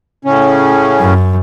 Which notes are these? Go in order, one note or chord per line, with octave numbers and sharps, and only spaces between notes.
A2 C#3 C#4
F#2